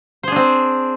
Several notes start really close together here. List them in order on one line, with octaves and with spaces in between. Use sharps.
C5 G#4 D4 C4